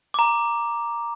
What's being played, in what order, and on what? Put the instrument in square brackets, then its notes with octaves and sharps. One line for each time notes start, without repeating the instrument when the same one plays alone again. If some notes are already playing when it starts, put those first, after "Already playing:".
[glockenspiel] A#5 D6